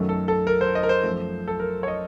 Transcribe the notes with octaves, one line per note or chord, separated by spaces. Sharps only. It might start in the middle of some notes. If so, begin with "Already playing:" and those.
Already playing: F#2 D#3 F#3 A3
A4
A4
A#4
C5
D#5
A#4
C5
F#2 F3 A3
A4
A#4
C#5
D#5